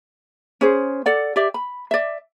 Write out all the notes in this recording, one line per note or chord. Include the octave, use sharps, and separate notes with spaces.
C#4 G#4 C5
A4 D5 F#5
G4 D5 E5
B5
D5 E5